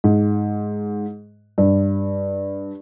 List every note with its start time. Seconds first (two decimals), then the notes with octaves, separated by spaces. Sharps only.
0.04 G#2
1.58 G2